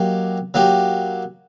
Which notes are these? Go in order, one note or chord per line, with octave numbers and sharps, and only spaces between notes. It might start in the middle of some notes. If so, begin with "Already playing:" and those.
Already playing: F#3 A#3 D#4 G4
F#3 A#3 D#4 G4